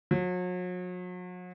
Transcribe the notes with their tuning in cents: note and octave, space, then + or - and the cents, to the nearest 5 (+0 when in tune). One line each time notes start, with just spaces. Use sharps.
F#3 -40